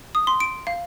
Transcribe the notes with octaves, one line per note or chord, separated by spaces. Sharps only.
D#6
C6
D7
F5